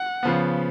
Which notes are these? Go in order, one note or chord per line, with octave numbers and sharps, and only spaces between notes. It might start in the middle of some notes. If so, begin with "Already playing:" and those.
Already playing: F#5
C#3 F3 B3